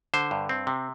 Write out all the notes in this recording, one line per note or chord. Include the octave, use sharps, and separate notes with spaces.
D3 C5
G2
C4
C3